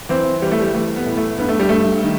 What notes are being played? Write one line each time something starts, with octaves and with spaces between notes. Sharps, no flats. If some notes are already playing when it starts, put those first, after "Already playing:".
E3 C4
E3 G3
A3
G3
E3 A3
B3
A2
A3
G2 B3
A3
G3
G2 A3
D#3